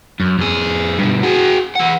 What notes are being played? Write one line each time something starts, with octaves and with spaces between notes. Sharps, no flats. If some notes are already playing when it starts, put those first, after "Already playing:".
F#2
F2 G#4
G2 B2
F#4 G#4
E3 F#5